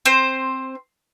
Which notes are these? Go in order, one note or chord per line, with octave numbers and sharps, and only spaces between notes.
C4 C5